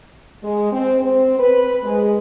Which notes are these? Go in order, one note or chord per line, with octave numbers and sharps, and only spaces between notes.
G#3
C4
C4
B4
G#3